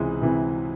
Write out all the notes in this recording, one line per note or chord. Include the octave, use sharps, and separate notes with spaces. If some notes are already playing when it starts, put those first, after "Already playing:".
Already playing: C#2 C3 E3 G#3
C3 E3